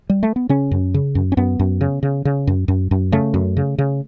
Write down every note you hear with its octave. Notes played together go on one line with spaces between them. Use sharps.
G3
A3
B3
C#3 C#4
F#2
C#3
F#2
C#4
F#2 B3
F#2
C#3
C#3
C#3
F#2
F#2
F#2
C#3 A3
F#2
C#3
C#3